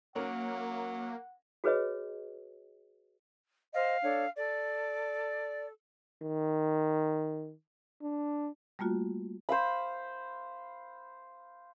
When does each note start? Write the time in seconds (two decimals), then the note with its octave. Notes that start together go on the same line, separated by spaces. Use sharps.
0.16 F#3 A#3 C#4 A#4 F#5
1.64 F#4 G#4 B4 C#5 D#5
3.74 C5 D#5 F5
4.02 D4 A4 C#5
4.36 A4 D5
6.22 D#3
8.02 D4
8.79 G3 A3 A#3 F4 F#4
9.49 C5 F5 B5